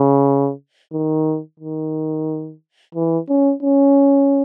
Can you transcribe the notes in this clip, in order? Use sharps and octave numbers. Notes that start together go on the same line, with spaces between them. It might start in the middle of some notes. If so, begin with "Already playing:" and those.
Already playing: C#3
D#3
D#3
E3
C#4
C#4